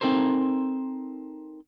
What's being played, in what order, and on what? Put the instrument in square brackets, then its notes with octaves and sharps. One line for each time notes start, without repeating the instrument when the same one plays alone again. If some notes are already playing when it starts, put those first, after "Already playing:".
[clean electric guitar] C4 D#4 A4 A#4 C5